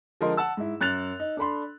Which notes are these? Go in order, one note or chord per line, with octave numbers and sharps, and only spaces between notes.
D3 F3 G#3 A#4 D#5 C6
F#5 A5 E6
G#2 E4
F#2 F#6 A6 F7
D#4
D4 A4 B5 C6